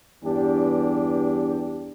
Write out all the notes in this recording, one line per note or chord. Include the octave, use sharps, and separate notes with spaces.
E2 G2 D4 G4